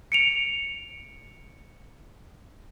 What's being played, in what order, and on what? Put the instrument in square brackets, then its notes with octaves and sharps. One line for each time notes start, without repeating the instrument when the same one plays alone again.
[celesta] C#7 D7 F7